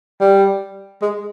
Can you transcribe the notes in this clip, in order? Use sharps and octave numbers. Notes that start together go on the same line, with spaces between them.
G3
G#3